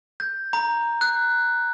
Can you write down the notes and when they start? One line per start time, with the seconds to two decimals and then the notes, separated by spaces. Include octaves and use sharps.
0.20 G6
0.53 A#5
1.01 F#6